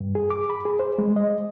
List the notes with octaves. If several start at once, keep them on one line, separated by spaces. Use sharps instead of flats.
G2
G#4
D6
B5
G#4
C5
G#3
D#5